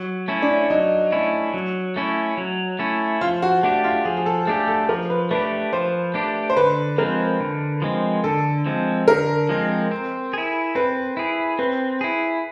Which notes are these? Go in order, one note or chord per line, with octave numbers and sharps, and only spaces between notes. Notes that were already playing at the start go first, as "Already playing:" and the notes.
Already playing: F#3
A3 C#4 E4
D4
F#3 D#4
A3 C#4 E4
F#3
A3 C#4 E4
F#3
A3 C#4 E4
F3 F4
F#4
A3 D4 F#4 G4
F4
F3 G#4
G#4
A4
A3 D4 G4 G#4
A4
F3 A#4
B4
A3 D4 G4 B4
F3 C5
A3 D4 G4
C5
D3 B4
F3 G#3 C4 A#4
D3
F3 G#3 C4
D3 A4
F3 G#3 C4
D3 A#4
F3 G#3 C4
C4
E4 G#4
C4 B4
E4 G#4
C4 B4
E4 G#4